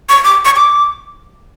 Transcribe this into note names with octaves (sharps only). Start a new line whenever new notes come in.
C#6
D6
C#6
D6